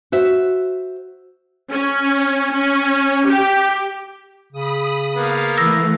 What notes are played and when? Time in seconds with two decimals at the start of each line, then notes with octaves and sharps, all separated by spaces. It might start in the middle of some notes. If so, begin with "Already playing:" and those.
0.12 F#4 C5 E5
1.71 C#4
2.53 C#4
3.27 G4
4.53 C#3 B5 D#6
5.16 A#3 B3 F5
5.58 E3 A3 E6 A#6